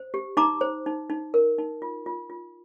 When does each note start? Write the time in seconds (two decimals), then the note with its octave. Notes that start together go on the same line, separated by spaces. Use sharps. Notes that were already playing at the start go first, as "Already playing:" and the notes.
Already playing: C5
0.14 G4
0.37 D#4 A#5 D6
0.61 C5
0.86 D#4
1.10 D#4
1.34 A#4
1.58 D#4
1.82 F4
2.06 F4
2.30 F4